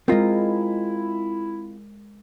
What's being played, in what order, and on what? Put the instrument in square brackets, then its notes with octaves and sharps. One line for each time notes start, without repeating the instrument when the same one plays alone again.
[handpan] G#3 A#4 [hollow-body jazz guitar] C4 F4 D#5 [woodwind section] E4